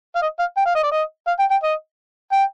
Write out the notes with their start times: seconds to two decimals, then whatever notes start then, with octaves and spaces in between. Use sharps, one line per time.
0.16 F5
0.22 D#5
0.39 F5
0.57 G5
0.66 F5
0.75 D#5
0.83 D5
0.92 D#5
1.27 F5
1.39 G5
1.51 G5
1.63 D#5
2.32 G5